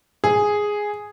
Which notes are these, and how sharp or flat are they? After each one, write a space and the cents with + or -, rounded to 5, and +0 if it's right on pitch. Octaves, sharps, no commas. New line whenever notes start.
G#4 +0